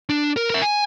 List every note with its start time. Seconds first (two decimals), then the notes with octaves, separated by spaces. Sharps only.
0.09 D4
0.37 A#4
0.50 A#4 E5
0.62 G#5